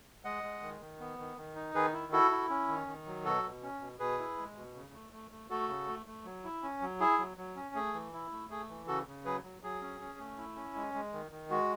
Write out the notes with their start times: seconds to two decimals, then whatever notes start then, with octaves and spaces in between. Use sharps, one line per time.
0.25 G#3 D#5 F#5
0.43 G#3
0.62 D#3
0.81 D#3
1.00 B3
1.18 D#3
1.37 D#3
1.56 D#4
1.75 D#3 G#4 B4
1.93 E4
2.12 E4 F#4 A4
2.31 E4
2.50 C#4
2.68 D#3
2.87 D#3
3.06 F#3
3.24 B2 F#4 A4
3.43 B2
3.63 C#4
3.81 B2
3.99 B2 G#4 B4
4.19 E4
4.38 G#3
4.56 B2
4.75 C#3
4.94 A3
5.13 A3
5.31 A3
5.50 A3 F#4 A4
5.69 C#3
5.87 A3
6.06 A3
6.25 F#3
6.44 E4
6.63 C#4
6.82 F#3
7.00 E4 G#4
7.19 F#3
7.37 F#3
7.56 C#4
7.75 A3 G#4
7.94 E3
8.13 E4
8.31 A3
8.50 A3 G#4
8.69 E3
8.88 C#3 F#4 A4
9.07 C#3
9.25 F#3 G#4 B4
9.44 F#3
9.62 F#3 G#4
9.82 C#4
10.00 C#4
10.19 A3
10.38 E4
10.56 C#4
10.76 G#3
10.94 G#3
11.13 D#3
11.31 D#3
11.50 G#3 F#4